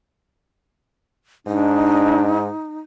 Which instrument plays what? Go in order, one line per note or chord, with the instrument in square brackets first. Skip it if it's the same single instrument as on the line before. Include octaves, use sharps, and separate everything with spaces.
[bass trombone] G#2 [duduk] D4 [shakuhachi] D#4